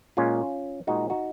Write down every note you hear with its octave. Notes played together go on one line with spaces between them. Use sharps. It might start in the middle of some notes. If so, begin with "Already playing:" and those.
A#2 G#3 C#4 F4
A#2 G#3 D#4 F#4
D#4 F#4